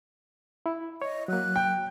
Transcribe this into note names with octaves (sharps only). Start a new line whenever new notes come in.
E4
C#5 D#5
F#3 A#3 F#6
G5